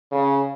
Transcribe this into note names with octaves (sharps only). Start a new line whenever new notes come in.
C#3